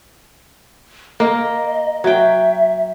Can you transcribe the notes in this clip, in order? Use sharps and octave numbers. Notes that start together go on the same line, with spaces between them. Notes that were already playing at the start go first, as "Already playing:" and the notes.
A#3 D#5
F#3 E5 G5